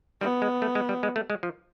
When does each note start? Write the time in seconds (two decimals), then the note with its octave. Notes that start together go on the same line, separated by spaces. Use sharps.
0.21 G3 B3
0.42 G#3
0.62 A3
0.75 G#3
0.89 G3
1.03 G#3
1.16 A3
1.30 G#3
1.43 F3